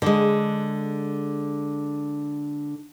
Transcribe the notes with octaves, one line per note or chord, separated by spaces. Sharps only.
D3 G#3